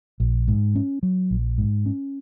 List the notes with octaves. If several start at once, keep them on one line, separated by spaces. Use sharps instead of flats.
A#1
G#2
C#4
F#3
A#1
G#2
C#4